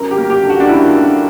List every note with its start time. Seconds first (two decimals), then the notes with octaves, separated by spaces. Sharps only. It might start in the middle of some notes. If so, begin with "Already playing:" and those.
Already playing: F#2 A#4
0.11 G4
0.18 A#3
0.30 G4
0.43 D3
0.50 F#4
0.60 D4
0.69 F#2 E4
0.95 F#2